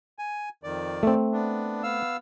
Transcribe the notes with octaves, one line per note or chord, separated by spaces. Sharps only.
G#5
F2 D#3 D5
A3 C4
B3 D4
B3 F5 E6